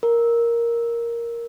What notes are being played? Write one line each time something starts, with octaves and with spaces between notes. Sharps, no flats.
A#4